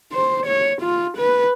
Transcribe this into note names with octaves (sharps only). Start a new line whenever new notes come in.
C5
C#5
F4
B4